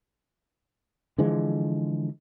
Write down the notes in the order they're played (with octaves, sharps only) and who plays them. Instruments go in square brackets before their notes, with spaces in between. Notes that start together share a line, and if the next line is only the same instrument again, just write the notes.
[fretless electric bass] D3 E3 F3 G#3